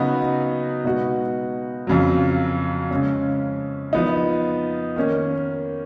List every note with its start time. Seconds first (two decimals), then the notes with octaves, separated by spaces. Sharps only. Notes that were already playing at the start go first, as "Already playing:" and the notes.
Already playing: C#3 F#3 B3 D#4 F#4
0.84 B2 G#3 D#4 F#4
1.87 F2 C#3 F#3
2.91 C#3 G#3 C#4
3.93 F3 B3 D#4
4.96 D#3 A#3 C#4